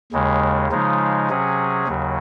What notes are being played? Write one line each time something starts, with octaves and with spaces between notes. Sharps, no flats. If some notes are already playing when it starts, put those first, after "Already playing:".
D#2 C#3 G#3
C#3 F3 G#3 D#4
C3 F#3 C#4 G#4
D#2 C#3 F#3